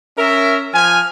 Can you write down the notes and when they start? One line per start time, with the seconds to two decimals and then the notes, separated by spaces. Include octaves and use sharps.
0.17 C#4 A#4 E5
0.73 F3 G#5 F6